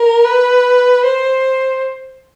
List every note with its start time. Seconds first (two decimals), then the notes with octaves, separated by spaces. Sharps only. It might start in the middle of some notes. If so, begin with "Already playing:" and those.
Already playing: A#4
0.25 B4
1.04 C5